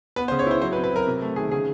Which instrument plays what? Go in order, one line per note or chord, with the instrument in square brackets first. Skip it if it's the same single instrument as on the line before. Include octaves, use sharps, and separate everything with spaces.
[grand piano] B3 B4
C5
C#3
C#5
E4 C5
F#3 C5
B4
C4
B4
F#3 A#4
C3
A3
D#3 G#4
C#3 G#4